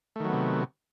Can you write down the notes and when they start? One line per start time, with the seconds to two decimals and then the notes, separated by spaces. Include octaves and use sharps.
0.16 A3
0.20 D#3
0.24 F#3
0.29 B3
0.33 C3